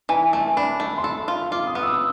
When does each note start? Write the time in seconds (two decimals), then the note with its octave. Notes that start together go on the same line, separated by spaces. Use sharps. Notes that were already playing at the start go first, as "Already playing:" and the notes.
0.09 E3 G#5
0.33 A3 A5
0.57 D4 B5
0.80 A3
0.98 C6
1.04 A4 B5
1.28 F4 C6
1.51 F4 D6
1.67 D#6
1.75 B3
1.83 E6